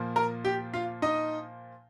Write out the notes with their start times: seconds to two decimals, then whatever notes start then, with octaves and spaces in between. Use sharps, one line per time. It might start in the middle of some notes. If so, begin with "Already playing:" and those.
Already playing: A#2 F3 A#3
0.16 A#4 A#5
0.45 G4 G5
0.74 F4 F5
1.02 D#4 D#5